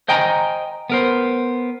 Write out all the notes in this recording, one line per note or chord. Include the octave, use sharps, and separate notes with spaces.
C5 D#5 G5 G#5 A#5
B3 A#4 C5